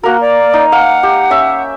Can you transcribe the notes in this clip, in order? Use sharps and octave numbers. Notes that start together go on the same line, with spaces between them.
A#3 F#4 A#4
D5
D#4
F5 F#5
G4
C#4 E5